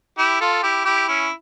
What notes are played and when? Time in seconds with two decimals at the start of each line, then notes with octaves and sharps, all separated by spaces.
0.18 E4 G4
0.41 F4 A4
0.63 E4 G4
0.85 E4 G4
1.08 C#4 E4